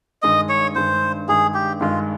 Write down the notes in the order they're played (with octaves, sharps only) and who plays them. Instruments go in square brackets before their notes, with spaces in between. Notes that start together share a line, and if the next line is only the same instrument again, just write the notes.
[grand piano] G2 D#3 G#3 [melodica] D#5
[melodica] C#5
[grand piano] G2 D#3 G#3 [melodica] C5
[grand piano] G2 D#3 G#3 [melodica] G#4
[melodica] G4
[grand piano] G2 D#3 G#3 [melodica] F4